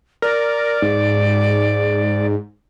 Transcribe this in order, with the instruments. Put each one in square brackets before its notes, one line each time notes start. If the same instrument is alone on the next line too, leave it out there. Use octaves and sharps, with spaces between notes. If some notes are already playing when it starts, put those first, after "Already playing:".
[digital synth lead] A#4 [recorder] D5
[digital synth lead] G#2